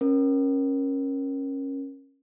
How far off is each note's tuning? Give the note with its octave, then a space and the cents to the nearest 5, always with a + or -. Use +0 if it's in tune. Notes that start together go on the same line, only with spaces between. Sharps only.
C#4 -20 A#4 +20